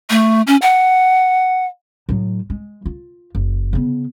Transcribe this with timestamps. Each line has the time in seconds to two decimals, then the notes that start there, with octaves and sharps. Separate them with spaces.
0.10 A3
0.47 C#4
0.62 F#5
2.09 A2 F#3
2.50 G#3
2.86 F4
3.35 F#1
3.73 C#3 B3